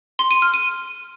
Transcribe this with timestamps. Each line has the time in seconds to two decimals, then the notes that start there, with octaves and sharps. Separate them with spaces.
0.19 C6
0.31 D#7
0.42 F6
0.54 D#7